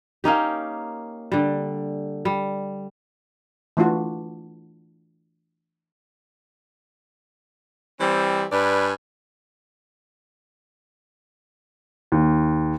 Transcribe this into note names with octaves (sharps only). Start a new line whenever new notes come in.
A#3 C#4 D#4 G4
D3 G3
G3
E3 A3 D4 F4 F#4
E3 G3 C4
G2 B4 D5 G#5
D#2